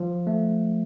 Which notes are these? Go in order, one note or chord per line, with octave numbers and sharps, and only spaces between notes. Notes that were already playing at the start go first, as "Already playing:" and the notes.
Already playing: F3
A3